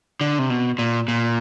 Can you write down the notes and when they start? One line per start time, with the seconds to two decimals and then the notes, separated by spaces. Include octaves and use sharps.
0.21 D3
0.39 C3
0.50 B2
0.79 A#2
1.08 A#2